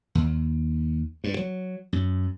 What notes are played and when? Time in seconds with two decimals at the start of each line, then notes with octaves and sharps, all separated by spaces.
0.15 D#2
1.24 G2
1.39 F#3
1.93 F#2